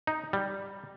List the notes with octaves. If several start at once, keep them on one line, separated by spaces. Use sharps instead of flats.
D#4
G3